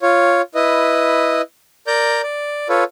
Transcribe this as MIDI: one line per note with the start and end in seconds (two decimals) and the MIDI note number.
0.02 0.42 65
0.02 0.42 73
0.55 1.42 64
0.55 1.42 71
0.55 1.42 75
1.87 2.22 70
1.87 2.22 74
1.87 2.22 82
1.87 2.22 91
2.23 2.68 74
2.69 2.84 65
2.69 2.84 69
2.69 2.84 71
2.69 2.84 73